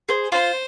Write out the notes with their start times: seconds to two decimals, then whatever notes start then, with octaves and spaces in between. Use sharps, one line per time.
0.09 G#4 C5
0.32 F4 C5